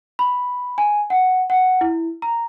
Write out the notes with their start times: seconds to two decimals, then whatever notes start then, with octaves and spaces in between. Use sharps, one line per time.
0.19 B5
0.78 G#5
1.10 F#5
1.50 F#5
1.81 E4
2.22 A#5